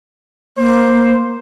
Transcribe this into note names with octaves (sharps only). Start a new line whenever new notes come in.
A#3 C5